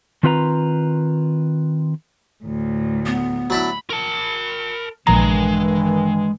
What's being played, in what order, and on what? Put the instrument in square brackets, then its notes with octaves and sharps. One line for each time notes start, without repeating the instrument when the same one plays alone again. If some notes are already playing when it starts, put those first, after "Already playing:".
[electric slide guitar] D#3 C4 F4 B4 F#5 A#5
[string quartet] D2 A2
[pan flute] B3
[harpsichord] F#3 D4 E4 [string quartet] B5
[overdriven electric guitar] A#4 A5
[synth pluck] A#1 A#5 [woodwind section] G2 D#3 E3 [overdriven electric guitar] G#3